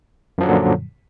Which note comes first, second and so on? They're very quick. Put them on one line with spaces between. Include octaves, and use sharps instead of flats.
F#2 F3 F#3 D3 A#2